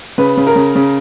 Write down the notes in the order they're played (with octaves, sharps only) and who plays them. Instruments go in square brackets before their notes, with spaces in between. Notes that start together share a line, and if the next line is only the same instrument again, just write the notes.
[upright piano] C#3 B4
C#3
A#4
C#3
C#3